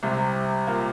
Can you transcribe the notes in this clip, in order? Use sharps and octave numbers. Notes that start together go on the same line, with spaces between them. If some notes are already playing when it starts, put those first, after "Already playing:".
C2 C3
A#2 A#3